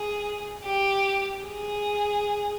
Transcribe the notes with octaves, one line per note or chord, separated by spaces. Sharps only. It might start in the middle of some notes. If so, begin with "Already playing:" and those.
Already playing: G#4
G4
G#4